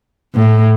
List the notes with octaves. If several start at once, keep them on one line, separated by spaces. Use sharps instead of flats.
A2